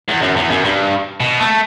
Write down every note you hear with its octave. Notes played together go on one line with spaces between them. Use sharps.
E2
F#2
E2
F#2
G2
B2
A3